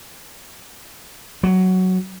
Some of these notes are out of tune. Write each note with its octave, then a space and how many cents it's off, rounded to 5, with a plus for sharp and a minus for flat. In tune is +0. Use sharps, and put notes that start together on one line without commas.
F#3 +5